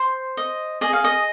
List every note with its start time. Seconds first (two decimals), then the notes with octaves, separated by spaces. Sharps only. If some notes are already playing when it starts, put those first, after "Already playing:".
Already playing: C5 C6
0.37 D#5
0.81 G#4 D#5
0.93 F5
1.04 D#5